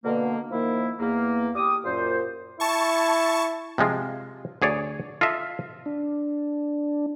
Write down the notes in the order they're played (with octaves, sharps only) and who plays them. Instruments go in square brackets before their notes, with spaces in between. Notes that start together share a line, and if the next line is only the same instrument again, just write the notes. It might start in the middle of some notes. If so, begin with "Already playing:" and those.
[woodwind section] B2 D3 A#3
D#3 F3 A#3 E4
E2 A#3
G4 D6 D#6
F#2 A#2 C5
[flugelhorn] E4 [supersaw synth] A5 C#6
[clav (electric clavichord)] C3 F3 G#3 F4
D2 G#4 C#5 D5
F4 A4 D#5 E5
[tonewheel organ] D4